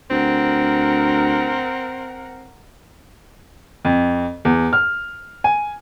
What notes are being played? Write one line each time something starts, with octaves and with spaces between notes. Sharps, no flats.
D2 C4 A#4 F#5
F2
E2
F6
G#5